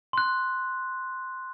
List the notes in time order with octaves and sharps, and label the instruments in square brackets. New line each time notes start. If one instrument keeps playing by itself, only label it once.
[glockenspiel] C6 F#6